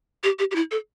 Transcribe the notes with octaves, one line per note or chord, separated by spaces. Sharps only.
G4
G4
G4
E4
A4